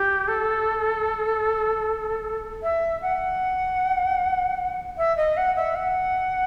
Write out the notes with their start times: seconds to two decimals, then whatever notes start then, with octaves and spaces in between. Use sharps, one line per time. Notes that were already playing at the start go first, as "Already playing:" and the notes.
Already playing: G4
0.28 A4
2.63 E5
3.02 F#5
4.98 E5
5.17 D#5
5.37 F#5
5.56 E5
5.75 F#5